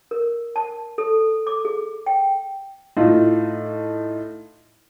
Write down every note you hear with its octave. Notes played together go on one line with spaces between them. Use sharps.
A#4
A5
A4
D6
G#4
G5
A2 D#4 F4